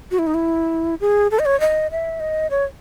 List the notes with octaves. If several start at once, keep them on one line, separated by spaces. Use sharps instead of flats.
F#4
E4
D#4
E4
G#4
A4
D#5
C#5
D#5
E5
D#5
C#5